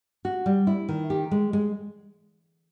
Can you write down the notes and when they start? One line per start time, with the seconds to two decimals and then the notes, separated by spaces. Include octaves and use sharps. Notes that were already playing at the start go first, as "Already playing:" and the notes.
0.25 F#4
0.46 G3
0.67 E4
0.89 D#3
1.10 G4
1.31 G#3
1.53 G#3